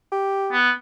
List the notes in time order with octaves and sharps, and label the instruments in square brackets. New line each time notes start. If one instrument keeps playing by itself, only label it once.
[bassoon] G4
[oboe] B3